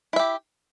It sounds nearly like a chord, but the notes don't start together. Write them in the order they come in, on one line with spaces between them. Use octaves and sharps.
E4 E5 G4